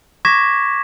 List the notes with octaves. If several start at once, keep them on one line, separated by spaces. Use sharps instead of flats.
C#6 D6 G#6 A#6 B6 E7